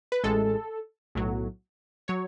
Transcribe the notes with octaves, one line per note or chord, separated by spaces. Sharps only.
B4
A1 A2 G#3 A4
B1 A2 F#3
F#3 C#5